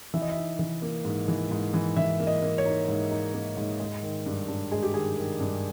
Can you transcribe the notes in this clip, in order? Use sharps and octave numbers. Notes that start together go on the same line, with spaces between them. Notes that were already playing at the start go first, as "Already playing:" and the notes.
E3 E5
D#5
E5
D#4
E3
A#3
G#2
E3
G#2
E3
E3 E5
A#3
D#5
A#3
C#5
D#4
G#2
D#4
A#3
G#2
G#3
D#3
G2
G2
G#3 G#4
G4
D#3 G#4
D#3
G2